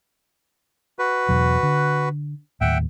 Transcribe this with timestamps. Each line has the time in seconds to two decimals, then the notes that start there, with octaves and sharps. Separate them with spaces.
0.99 F#4 B4
1.29 E2 B2 F#3
1.63 D3
2.61 D#2 A2 E5 F#5 G5